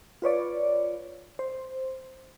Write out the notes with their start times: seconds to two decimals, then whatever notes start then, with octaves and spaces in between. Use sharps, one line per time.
0.22 F4 B4 C#5 D5
1.39 C5